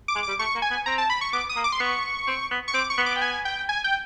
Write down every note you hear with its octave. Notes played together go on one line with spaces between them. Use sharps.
D6
G#3
G3 D6
A3 C#6
A#3
G#5
B3
C4 A#5
A5
B5
C#6
B3 D6
D#6
A#3
D6
C6
B3 C#6
C4
B3
C#6
C4 D6
C#6
B3
D6
G5
G#5
G5
G#5
G5